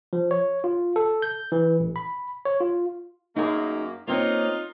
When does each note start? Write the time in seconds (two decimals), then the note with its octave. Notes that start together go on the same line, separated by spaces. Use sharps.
0.13 F3
0.31 C#5
0.64 F4
0.96 A4
1.22 G6
1.52 E3
1.80 A1
1.96 B5
2.45 C#5
2.61 F4
3.36 F#2 A#3 D#4 G#4
4.07 A#3 C4 C#4 D#4 F4